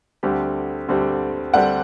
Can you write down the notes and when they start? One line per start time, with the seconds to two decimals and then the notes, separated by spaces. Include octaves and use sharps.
0.23 D2 D3 G3 C4 G4
0.89 D2 D3 G3 C4 G4
1.54 D2 D3 G3 C4 G4 D5 F#5